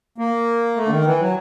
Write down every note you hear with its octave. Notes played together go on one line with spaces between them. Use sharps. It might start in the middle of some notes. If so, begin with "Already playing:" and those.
A#3
A3
D3
D#3
E3
F#3